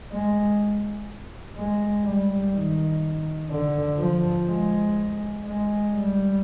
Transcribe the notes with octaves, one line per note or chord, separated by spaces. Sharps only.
G#3
G#3
G3
D#3
D3
F3
G#3
G#3
G3